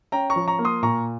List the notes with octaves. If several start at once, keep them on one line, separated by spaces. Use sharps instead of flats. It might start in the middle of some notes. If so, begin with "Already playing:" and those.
C#4 G5 A#5
A#5 C#6
F3
A#5 C#6
A#3
C6 D#6
A#2 A#5 C#6